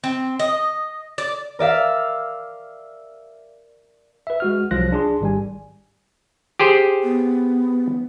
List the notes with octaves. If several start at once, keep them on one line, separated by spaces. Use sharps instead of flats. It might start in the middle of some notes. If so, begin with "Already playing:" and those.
C4
D#5
D5
A#4 D5 E5 F5
B4 E5
G#3 F#4 F6
C2 F3 F#3 F4 F#6 A#6
D4 G#4 C6
G#1 G3 G#5
G4 G#4 C5
B3